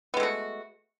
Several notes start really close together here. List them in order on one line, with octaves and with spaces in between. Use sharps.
B3 G#3 A3 F#4